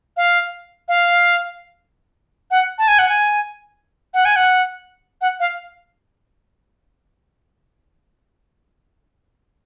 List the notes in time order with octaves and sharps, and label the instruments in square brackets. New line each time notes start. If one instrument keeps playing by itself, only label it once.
[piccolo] F5
F5
F#5
A5
G#5
F#5
G#5
F#5
G#5
F#5
F#5
F5